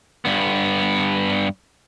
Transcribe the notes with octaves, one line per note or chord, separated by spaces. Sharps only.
G2 B3